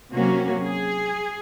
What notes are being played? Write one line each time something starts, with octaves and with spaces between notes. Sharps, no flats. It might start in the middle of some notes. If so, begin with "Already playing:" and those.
C3 F#3 A#3 C#4 F#4
G#4